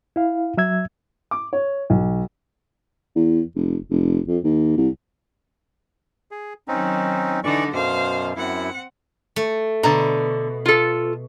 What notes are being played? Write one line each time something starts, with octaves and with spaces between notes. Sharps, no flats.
E4 F5
F#3 E5 E6 G#6
D6
C#5
B1
E2
F1
F1
F2
D#2
C2
G#4
D#3 F#3 C4 C#4 D#4
D3 E3 D#4 D5 C#6
F#2 B2 C5 F5
F#2 C4 E4 F#5
A3
B2 D3 A#5
F4 A4